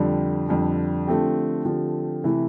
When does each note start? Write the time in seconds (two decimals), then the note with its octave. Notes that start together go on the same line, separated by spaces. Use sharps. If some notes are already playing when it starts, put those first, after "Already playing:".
Already playing: F2 D3 G3
0.49 F2 D3 G3
1.07 D3 F3 A3 C4 G4
1.65 D3 F3 A3 C4 G4
2.24 C3 E3 A3 E4